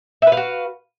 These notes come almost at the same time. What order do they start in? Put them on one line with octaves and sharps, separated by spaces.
E5 B4 F5 F#4